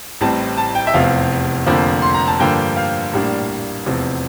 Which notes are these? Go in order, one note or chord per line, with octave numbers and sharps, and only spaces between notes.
A1 A2 G3 C4 A5
A5
G5
E5
F1 E2 C3 F3 F5
F1 F2 D3 F3 A#3
C6
A#5
A5
G2 D3 F3 A#3 G5
F5
A#1 A2 G3 A#3 D4
F1 E2 C3 F3